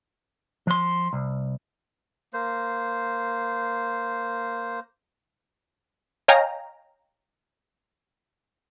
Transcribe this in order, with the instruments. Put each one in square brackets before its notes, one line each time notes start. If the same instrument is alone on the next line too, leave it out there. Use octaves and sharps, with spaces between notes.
[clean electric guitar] F3 C6
C2
[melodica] A#3 C5
[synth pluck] C#5 D#5 F5 G5 G#5 A#5